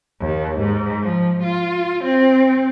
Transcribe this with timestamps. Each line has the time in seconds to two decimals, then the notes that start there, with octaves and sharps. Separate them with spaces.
0.21 D#2
0.60 G#2
1.02 F3
1.44 F4
2.04 C4